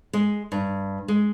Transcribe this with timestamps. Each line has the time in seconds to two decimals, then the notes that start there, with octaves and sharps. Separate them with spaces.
0.13 G#3
0.52 G2
1.08 G#3